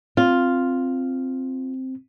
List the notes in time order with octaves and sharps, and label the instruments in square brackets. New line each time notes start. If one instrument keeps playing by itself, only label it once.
[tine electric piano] C4 [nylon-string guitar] F4